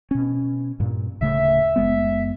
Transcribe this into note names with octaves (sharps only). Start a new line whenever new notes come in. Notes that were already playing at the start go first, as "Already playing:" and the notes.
B2 C#4
G2 A#2
D1 C#3 A3 E5
F#1 G#3 B3